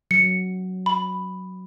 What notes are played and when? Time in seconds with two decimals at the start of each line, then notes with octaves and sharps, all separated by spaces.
0.11 F#3 C#7
0.86 B5